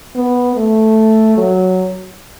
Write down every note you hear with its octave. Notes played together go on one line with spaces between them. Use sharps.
B3
A3
F#3